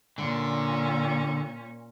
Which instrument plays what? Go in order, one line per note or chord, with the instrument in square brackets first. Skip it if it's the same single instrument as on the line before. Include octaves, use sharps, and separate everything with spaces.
[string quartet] A#2 C#4 [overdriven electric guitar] D3